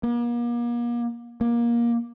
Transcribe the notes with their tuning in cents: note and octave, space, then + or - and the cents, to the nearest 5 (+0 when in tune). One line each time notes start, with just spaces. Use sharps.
A#3 +40
A#3 +20